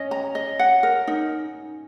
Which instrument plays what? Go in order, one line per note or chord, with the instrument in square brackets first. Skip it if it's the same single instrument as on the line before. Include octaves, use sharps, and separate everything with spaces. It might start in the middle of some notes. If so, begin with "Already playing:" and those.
Already playing: [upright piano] C#4 [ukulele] D#5
[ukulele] A#5
D#5
F#5
A#4
D#4